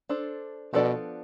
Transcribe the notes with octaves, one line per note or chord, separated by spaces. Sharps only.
D4 A4 C5
B2 F3 B3 D4 A4 D5